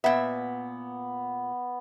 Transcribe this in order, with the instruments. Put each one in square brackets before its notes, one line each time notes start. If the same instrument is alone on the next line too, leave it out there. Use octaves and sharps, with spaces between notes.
[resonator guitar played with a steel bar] A#2 E5 [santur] B3